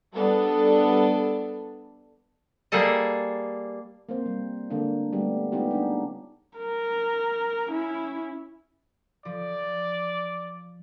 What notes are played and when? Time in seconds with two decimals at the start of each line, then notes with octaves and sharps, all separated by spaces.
0.13 G3 B3 D4 A4
2.72 G3 A#3 G#4 A4 D#5
4.09 A#3 C4 C5
4.26 G3
4.70 D3 G#3 A#3 D4
5.13 G3 A3 B3 G4
5.52 G#3 B3 C#4 D#4 F4 G4
5.71 D4 D#4
6.57 A#4
7.68 C#4 E4
9.25 F3 D5